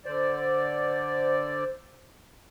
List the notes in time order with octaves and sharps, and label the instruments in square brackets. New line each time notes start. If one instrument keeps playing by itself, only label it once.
[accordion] D3 D5 [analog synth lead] C5